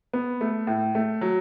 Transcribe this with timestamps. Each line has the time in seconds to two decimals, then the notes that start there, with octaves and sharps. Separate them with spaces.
0.13 B3
0.41 A3
0.67 A2
0.95 A3
1.21 F#3